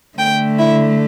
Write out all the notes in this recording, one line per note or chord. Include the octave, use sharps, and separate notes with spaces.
D3 A3 G5
E4